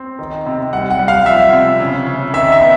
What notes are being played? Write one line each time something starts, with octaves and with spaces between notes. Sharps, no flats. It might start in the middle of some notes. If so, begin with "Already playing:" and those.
Already playing: C4
D#3
C3
G3 F#5
F#5
G3
F5
F3 E5
C3
C#3
C#3
D#3 E5
E5
B3